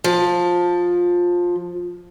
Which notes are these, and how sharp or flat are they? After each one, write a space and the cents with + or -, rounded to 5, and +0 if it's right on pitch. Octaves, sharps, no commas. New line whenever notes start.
F3 +15